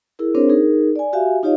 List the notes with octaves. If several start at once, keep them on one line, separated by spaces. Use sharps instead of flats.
E4 G#4 A#4
C4 D4 G#4 A#4 C5 C#5
D#4 G#4 A#4
D5 G#5
F#4 G4 E5 F5 G#5
D#4 F4 G4 C#5 D#5 F5